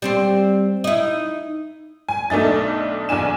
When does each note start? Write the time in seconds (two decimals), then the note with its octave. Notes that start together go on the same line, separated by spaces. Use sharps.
0.02 G3 C4 C5
0.84 D#4 E4
2.09 G#5
2.30 B1 A3 D4 D#4 A6
3.09 B1 E2 D4 G#5 E7